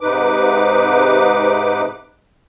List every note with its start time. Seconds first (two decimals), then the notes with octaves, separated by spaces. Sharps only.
0.01 G#2 C3 D#4 B4 D6